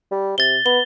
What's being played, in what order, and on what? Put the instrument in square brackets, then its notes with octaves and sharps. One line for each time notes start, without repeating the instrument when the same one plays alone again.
[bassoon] G3
[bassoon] C3 [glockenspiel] A6 G7
[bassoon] B3 [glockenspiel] G7